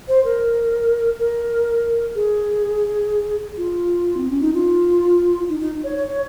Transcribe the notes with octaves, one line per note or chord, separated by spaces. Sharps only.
C5
A#4
A#4
G#4
F4
C4
C#4
D#4
F4
D#4
D#4
C#5
C#5